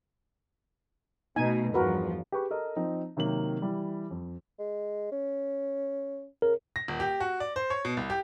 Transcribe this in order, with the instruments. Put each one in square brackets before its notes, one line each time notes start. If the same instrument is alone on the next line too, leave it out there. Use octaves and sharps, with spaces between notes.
[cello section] B2 A3 [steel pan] D#4 G#5
[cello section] E2 G2 F3 [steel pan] F#4 A#4 B4
[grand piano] G4 G#4 B4 C#6
A4 A#4 D#5
F3 C4 D#4
C3 D#3 F#3 A#3 F#7
E3 G3
F2
[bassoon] G#3
C#4
[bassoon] C#3 [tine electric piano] A#4
[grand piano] A#6
D#1
G4
F#4
D5
C5
C#5
B2
C2
G4